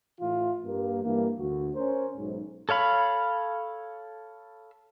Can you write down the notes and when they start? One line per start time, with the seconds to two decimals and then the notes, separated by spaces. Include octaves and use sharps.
0.19 A2 E3 E4 F4
0.65 G2 A#3
1.03 G2 E3 A#3
1.38 D2 F#4
1.75 C#4 A#4 C5
2.15 B1 G#2
2.69 A4 C#5 F5 B5